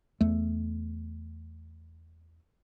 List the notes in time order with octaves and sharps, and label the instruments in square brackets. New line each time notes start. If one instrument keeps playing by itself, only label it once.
[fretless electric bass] E2 A3